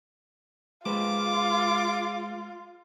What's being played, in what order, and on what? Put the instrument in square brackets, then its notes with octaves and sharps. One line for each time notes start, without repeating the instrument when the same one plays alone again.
[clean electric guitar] G#3 B4 C5 [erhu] F4 [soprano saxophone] D6